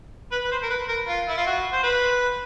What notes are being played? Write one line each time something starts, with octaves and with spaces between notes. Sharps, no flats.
B4
B4
C5
A#4
B4
A#4
F4
E4
F4
F#4
C5
B4